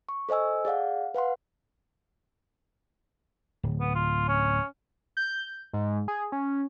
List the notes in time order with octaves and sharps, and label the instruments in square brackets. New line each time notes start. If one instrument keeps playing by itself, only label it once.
[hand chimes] C#6
A4 C5 D#5 G#5 E6
G#4 D5 F5 F#5
B4 F5 F#5 C6
[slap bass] D1
[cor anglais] B3
F4
C#4
[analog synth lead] G6
G#2
G#4
C#4